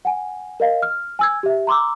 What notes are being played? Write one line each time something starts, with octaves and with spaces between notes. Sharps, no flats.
F#5 G#5
A#4 D#5 F5
F6
G#5 E6 G#6
G4 E5
A#5 C6 D6 E6